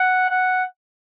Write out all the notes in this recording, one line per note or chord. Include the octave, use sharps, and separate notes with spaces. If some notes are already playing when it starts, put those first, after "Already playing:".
Already playing: F#5
F#5